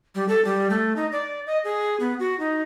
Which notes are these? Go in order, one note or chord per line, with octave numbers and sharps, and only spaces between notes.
G3
A4
G3
A3
D#4
D5
D#5
G#4
B3
F#4
D#4